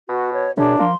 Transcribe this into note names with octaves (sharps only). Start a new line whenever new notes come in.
B2 F#4
C#5
F#2 B2 D4 G#4
F3 A#3 C6